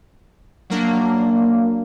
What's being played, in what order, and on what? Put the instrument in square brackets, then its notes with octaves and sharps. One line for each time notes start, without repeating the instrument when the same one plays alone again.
[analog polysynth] F#3 A#3 D4